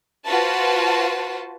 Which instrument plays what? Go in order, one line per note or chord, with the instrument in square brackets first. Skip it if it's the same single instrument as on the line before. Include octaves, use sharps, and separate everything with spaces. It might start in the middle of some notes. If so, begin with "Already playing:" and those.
[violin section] F4 F#4 B4 C5 A5